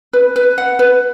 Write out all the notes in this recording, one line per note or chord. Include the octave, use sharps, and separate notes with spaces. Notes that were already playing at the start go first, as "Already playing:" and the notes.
B4
B4
F#5
B4